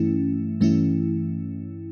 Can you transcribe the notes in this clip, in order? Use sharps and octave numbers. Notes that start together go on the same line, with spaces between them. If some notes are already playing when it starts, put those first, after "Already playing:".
Already playing: G2 E3 A3 C#4 E4
G2 E3 A3 C#4 E4